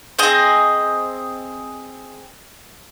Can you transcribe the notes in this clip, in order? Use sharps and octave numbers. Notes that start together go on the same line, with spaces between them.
C4 G#4 D#5